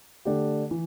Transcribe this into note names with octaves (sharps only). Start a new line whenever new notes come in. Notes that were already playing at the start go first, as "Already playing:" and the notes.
D3 A3 D4 G4
E3